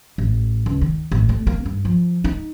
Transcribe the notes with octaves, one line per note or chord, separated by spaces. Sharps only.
A1
C#2
D#3
A1
A3
A#3
G2
F3
D#4